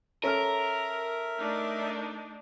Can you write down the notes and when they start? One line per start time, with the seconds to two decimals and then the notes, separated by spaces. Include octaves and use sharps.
0.24 C#4 A4 A#4 E5 F6
1.38 A3 D4 D#4